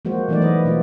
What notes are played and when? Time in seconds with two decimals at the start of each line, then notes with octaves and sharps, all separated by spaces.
0.05 F3 G#3 A#3 F#4 C5
0.29 E3 F#3 A3 B3 D#4 D5
0.42 B4 D#5
0.65 B2 A#3 D4 F4